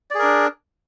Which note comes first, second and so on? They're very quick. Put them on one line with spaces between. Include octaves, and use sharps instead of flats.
D5 G#4 A#4 D4